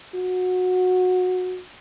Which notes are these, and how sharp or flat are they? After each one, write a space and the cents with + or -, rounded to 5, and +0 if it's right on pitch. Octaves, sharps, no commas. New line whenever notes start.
F#4 -20